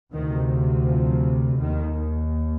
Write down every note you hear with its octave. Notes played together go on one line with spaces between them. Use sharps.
D2 C3 D#3
F3
D#2 D#3